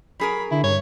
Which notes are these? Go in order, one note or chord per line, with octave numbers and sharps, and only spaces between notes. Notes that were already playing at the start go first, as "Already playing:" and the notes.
F#3 G#4 A#4 B5
D3 E4
G2 C#5